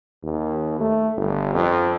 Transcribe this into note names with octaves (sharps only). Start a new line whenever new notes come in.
D#2
A3
G1
F2